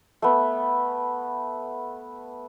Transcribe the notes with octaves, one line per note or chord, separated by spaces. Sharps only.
A3 B3